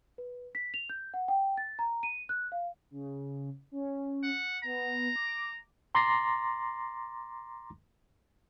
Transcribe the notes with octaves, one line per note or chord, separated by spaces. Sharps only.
B4
B6
F7
G6
F#5
G5
A6
A#5
D#7
F#6
F5
C#3
C#4
F#5
B3 A#5
D6
A#5 C6 D6 A6 A#6 C7